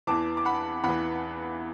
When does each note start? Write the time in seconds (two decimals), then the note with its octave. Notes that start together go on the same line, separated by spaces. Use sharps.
0.07 E2 E3 A5 D6
0.37 D6
0.45 F#5 B5
0.84 E2 E3 F#5 B5